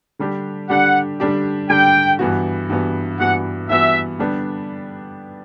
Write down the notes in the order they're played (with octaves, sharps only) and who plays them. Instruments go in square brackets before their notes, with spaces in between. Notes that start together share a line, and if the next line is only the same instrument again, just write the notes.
[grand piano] D3 G3 D4 G4
[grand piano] D3 G3 D4 G4 [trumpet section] F#5
[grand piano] D3 G3 D4 G4
[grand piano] D3 G3 D4 G4 [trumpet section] G5
[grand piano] G2 E3 B3 F#4
G2 E3 B3 F#4
[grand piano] G2 E3 B3 F#4 [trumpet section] F#5
[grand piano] G2 E3 B3 F#4 [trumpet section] E5
[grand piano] D3 G3 B3 D4